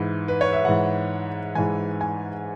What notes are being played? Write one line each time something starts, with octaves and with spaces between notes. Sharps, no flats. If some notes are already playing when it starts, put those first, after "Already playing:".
Already playing: G#2 E3
B4
C#5
E5
G#2 E3 F#5
G#2 E3 G#5
G#5